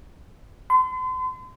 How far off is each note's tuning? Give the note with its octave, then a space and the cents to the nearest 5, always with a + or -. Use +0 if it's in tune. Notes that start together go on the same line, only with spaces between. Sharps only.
C6 -40